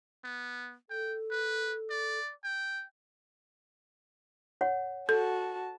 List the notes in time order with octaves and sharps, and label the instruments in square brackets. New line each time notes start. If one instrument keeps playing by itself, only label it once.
[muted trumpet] B3
[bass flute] A4 [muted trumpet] G5
[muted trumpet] B4
D5
G5
[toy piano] C#5 F#5
[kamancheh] F#4 A5 [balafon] A4